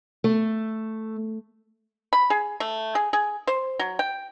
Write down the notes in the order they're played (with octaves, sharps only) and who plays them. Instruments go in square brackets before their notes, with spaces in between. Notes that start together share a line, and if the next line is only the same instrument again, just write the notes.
[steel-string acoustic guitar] A3
[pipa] B5
G#4
A3
G#4
G#4
C5
F#3
G5